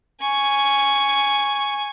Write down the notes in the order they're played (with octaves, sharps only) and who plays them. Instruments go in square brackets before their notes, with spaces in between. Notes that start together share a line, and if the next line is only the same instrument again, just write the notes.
[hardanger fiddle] G#5 C#6